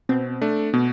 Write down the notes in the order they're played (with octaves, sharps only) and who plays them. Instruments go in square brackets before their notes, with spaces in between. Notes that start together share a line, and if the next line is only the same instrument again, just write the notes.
[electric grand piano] B2 [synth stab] C4
[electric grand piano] A3 D4
[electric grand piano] B2 [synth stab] B3